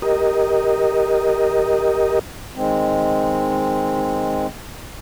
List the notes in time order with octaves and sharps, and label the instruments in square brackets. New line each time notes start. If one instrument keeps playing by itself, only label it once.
[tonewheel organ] G4 A#4 D#5
[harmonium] D#3 G#3 C4